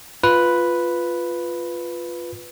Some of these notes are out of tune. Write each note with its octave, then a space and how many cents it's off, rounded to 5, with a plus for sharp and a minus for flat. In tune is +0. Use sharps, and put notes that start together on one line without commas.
F4 +0 B4 +0